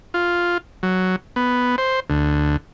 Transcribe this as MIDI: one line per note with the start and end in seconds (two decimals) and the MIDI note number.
0.14 0.58 65
0.83 1.16 54
1.36 1.76 59
1.78 2.00 72
2.10 2.57 38